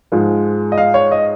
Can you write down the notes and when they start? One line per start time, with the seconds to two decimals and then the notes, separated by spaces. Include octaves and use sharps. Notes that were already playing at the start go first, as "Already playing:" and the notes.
0.12 G#2 F3 G#3
0.72 D#5
0.78 F5
0.94 C#5
1.12 D#5